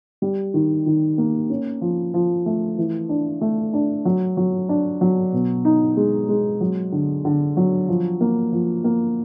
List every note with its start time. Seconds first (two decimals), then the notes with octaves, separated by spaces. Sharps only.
0.22 G3
0.54 D#3
0.86 D#3
1.18 A#3
1.50 C#4
1.81 F3
2.14 F3
2.46 A3
2.78 E3
3.09 D4
3.41 A3
3.73 D4
4.05 F#3
4.37 F#3
4.69 D4
5.01 F#3
5.33 B2
5.65 D#4
5.97 G#3
6.29 G#3
6.61 F#3
6.92 D3
7.25 D3
7.57 F#3
7.88 F3
8.21 A#3
8.52 F3
8.84 A#3